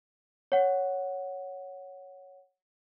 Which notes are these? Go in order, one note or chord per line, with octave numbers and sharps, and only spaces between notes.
C#5 F#5